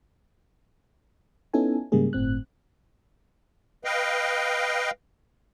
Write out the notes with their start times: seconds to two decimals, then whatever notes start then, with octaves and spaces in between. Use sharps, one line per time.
1.54 B3 C#4 D#4 E4 A4 G#5
1.92 G#2 C#3 G3 G#3 A#3 G#4
2.13 G1 A2 C4 F#6
3.85 B4 D#5 F5 G5